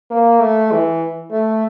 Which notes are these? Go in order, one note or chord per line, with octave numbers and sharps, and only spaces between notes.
A#3
A3
E3
A3